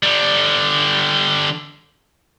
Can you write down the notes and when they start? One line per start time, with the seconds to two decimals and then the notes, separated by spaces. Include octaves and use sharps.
0.03 D3 G3